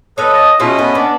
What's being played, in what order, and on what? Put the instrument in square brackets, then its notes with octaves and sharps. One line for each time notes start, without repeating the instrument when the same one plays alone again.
[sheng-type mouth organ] A4 B4 [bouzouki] C#5 F5 [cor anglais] D#5
[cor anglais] D#5 [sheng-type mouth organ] A5
[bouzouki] B2 G#3 E4 [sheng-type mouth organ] C#4 D#5 [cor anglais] F4
[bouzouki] A3 [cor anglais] B3
[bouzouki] B3 [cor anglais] D4